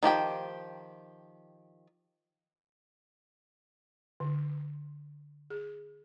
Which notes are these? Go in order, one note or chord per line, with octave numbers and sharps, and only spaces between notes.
D#3 F3 G4 G5
D3
G#4